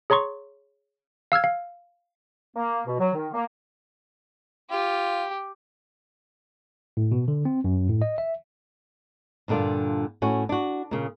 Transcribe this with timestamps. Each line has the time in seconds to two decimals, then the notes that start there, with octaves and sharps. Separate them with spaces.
0.10 G#4 C#5 A#5 C6 C#6
1.32 F5 E6 F6 G#6
1.44 F5
2.55 A#3
2.86 B2
2.98 F#3
3.13 D#3
3.33 A#3
4.71 F4 G4
6.97 A2
7.12 B2
7.28 D3
7.45 C4
7.64 F#2
7.89 A2
8.02 D#5
8.18 E5
9.48 G2 A#2 D3 D4 F4
10.22 A2 C#4 F#4
10.49 D4 F#4
10.91 A#2 C#3